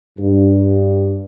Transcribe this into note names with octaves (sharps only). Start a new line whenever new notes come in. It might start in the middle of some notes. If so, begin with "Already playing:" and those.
G2